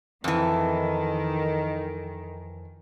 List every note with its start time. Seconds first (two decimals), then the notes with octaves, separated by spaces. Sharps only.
0.24 F2 D#3 E3